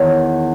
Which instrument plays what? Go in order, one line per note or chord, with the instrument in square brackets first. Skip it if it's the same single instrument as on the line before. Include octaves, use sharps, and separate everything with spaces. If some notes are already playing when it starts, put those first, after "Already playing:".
Already playing: [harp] E2 D#3 C#5